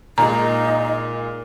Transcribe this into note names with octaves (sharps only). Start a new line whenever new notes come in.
A#2 G#3 D#4 A#5